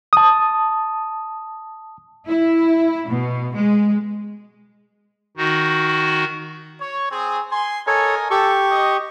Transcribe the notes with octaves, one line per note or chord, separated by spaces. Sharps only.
A5 D#6
E4
B2
G#3
D#3 D#4 F#4
C#5
C4 G#4
G#5 C6
A4 A#4 C#5 D#5 G#5
G4 A4 C#6
D#5